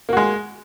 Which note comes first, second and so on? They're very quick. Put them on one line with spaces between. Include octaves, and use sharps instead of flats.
A#3 F#4 G#3